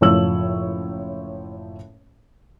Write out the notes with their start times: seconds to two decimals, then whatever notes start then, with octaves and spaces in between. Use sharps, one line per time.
0.01 F#1 A2 F3 C#5 E6 F#7